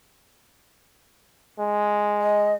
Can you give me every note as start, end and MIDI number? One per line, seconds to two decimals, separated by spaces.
1.59 2.56 56
2.20 2.54 75